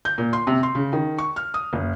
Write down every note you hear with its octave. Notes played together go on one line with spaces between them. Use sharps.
G6
A#2
C6
C3
C6
C#3
D#3
C#6
F6
D#6
F#1